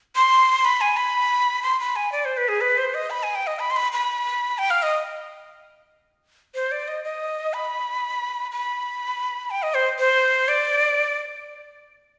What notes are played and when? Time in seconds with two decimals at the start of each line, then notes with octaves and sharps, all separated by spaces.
0.16 C6
0.65 B5
0.81 G#5
0.97 B5
1.62 C6
1.80 B5
1.96 G#5
2.12 D5
2.25 C5
2.37 B4
2.48 G#4
2.61 B4
2.78 C5
2.94 D#5
3.10 B5
3.23 G#5
3.35 G5
3.47 D#5
3.59 B5
3.70 C6
3.76 B5
3.92 B5
4.58 G5
4.70 F5
4.82 D#5
6.55 C5
6.71 D5
6.88 D#5
7.04 D#5
7.53 B5
8.51 B5
9.50 G5
9.62 D#5
9.74 C5
9.99 C5
10.48 D5